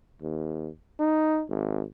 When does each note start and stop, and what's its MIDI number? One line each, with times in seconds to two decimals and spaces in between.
0.22 0.69 39
1.00 1.43 63
1.49 1.83 32